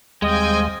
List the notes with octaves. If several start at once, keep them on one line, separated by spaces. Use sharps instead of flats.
D#2 G3 G#3 C4 D#5 F5 G5 G#5